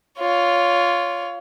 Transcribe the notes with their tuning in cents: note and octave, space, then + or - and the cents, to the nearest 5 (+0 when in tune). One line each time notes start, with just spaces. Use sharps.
F4 +0 C#5 +20